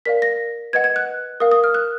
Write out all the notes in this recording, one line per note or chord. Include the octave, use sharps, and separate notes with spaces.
A#4 D5 F5 B6
A#6
B4 D#5 F#5 G#6
G#6
F#6
A#4 F5 D#6
D#6
F6
F#6